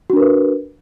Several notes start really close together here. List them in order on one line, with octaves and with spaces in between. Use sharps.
F#4 D4 A#4 B4